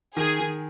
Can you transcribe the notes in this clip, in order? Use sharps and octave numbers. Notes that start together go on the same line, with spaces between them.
D#3 G#4
D#3